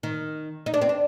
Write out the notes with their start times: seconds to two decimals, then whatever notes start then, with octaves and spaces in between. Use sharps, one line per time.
0.03 D#3
0.66 D#4
0.74 D4
0.82 C4
0.89 D4